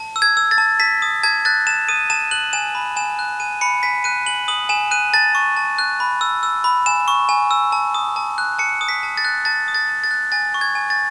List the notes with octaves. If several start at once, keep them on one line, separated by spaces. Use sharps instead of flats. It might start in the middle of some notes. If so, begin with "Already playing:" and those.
Already playing: A5
E6
G#6
E6
A6
A5
A5 B6
D#6
A5 G#6
F#6 A6
A5 E7
D#6 D#7
A5 E7
F#6 F#7
G#5 E7
B5
G#5 E7
F#6
G#5 D#7
B5 C#7
G#5 B6
F#6 D#7
G#5 F#7
D#6 F#7
G#5 E7
F#6 D#7
A5 A6
C#6
A5
F#6
B5
E6
E6
B5
G#5 E7
C#6
G#5
E6
A5
D#6
A5
F#6
A5 C#7
D#6
B6
A5
A6
F#6
A5 A6
D#6
A6
A5
A6
F#6
G#5 A6
C#6
G#6
G#5
A6